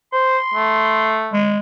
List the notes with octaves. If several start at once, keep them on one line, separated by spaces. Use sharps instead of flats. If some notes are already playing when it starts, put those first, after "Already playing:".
C5 C6
A3
G#3